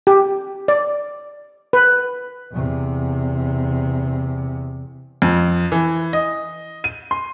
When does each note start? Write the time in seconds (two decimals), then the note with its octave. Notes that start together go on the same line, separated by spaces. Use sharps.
0.07 G4
0.68 D5
1.73 B4
2.53 E2 C3
5.22 F2
5.72 E3
6.13 D#5
6.84 D#7
7.11 C6